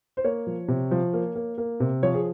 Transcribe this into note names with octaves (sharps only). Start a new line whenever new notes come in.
C5
A#3 C#5
F3
C3
F3
A#3
A#3
A#3
C3
F3 C#5
G#4